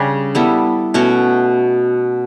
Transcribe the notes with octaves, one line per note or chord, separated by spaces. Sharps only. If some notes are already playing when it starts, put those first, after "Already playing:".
Already playing: C#3 G3 D4 G4
G3 B3 E4 A4
B2 A3 C#4 F#4